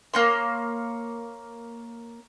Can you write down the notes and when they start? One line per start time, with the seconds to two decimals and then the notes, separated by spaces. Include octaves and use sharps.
0.14 A#3 C#5 C6